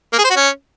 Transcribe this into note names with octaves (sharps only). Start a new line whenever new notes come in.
A#3
G#4
C5
F#4
C#4